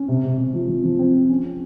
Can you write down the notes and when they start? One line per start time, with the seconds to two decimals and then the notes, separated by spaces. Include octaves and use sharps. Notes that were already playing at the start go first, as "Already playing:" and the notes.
Already playing: C#4
0.08 C3
0.23 C3
0.37 C3
0.53 F3
0.68 F3
0.83 F3
0.99 C4
1.14 F3
1.29 C#4
1.45 C#4